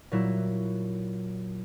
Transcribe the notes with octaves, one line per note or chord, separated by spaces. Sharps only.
A#2 F#3 E4